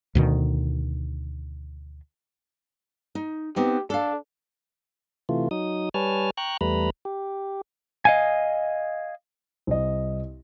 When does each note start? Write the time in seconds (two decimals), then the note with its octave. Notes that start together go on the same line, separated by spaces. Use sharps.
0.15 D2 B2 D#3
3.15 D#4
3.56 B3 C4 D#4 G4
3.90 D4 A4 F5
5.29 C3 E3 A3 F4
5.51 F#3 D#4 D#6
5.94 G3 B4 C#5 G#5 A5 F6
6.37 G5 A#5 C#6 F#6
6.61 E2 G3 A3 B4 A#5 B5
7.05 G4
8.05 D#5 F5 G#5
9.67 C2 D#5